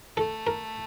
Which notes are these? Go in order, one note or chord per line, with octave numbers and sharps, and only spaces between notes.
A3 A4
A#4